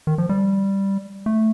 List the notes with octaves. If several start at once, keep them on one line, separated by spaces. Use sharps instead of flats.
D#3
F3
G3
A3